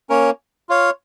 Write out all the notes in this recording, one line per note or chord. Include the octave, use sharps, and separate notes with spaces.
A#3 C#4 A#4 C#5
F4 C#5 F5